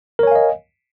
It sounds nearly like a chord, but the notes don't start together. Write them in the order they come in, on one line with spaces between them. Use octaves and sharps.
A#4 C#5 G#5 F5 D#5